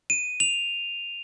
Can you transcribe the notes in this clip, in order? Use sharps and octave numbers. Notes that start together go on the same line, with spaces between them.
D#7
F7